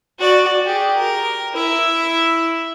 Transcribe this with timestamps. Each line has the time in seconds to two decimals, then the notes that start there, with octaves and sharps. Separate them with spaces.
0.19 F#4 D5
0.66 G4 G#4
0.96 A#4
1.54 E4 E5